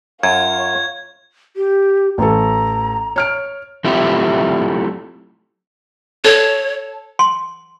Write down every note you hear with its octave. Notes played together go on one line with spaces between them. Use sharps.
F#2 F4 C#5 G#6
G4
A1 A4 A#5
C#5 F6 D7
F#3 A3 C4 E4 F4 G4
A4 C#5
C6